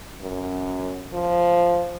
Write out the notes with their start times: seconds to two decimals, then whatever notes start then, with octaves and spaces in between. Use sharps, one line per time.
0.21 F#2
1.14 F3